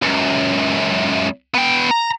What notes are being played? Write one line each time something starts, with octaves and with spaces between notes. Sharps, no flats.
C#2 F#2
B3 G5
A#5